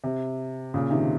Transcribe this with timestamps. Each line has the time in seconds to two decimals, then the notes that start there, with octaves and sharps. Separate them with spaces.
0.04 C3
0.74 A#2 C#3
0.90 C3 D#3